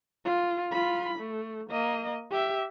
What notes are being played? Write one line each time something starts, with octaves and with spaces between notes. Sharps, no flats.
F4
F4 B5
A3
A#3 D#5
G4 E5